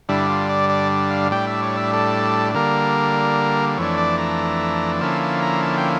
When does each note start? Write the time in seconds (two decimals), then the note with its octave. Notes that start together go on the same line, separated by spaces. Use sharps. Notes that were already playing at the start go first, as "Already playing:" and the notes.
0.09 G2 D3 G3 D4 E4
0.29 F4
0.49 D5
0.70 D5
1.11 F5
1.32 A2 G3 D4 G5
1.47 E5
1.63 C#5
1.77 E5
1.93 A4
2.54 D3 G3 A#3 A#4
3.78 F2 E3 A3 D4 C#5
3.98 D5
4.18 A#5
5.01 D3 F3 A#3 C#4 E4 A5
5.21 A5
5.42 A#5
5.62 A5
5.78 G5